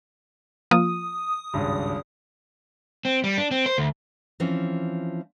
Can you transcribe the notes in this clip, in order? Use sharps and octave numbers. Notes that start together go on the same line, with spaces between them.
F3 A#3 F4 D#6
G#1 C#2 G2
C4
G3
D4
C4
C5
D2
E3 F3 C4 C#4